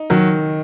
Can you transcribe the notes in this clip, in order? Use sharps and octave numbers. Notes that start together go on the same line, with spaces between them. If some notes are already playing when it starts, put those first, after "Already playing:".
Already playing: D#4
D#3 F#3